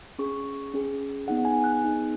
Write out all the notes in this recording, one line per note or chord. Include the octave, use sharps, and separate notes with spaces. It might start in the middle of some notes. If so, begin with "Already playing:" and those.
C#4 G#4 C#6
C#4 G#4
B3 D#4 G#4 F#5
G#5
F#6
B3 D#4 G#4